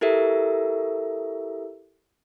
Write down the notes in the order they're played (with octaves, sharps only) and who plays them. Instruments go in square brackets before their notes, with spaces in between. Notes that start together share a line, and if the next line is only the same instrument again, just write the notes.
[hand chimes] E4 G4 A4 A#4 E5